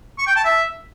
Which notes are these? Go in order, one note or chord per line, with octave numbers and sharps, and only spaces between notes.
C#6
G5
A5
E5